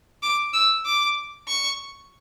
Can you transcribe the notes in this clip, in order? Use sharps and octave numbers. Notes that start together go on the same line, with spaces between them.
D6
E6
D6
C#6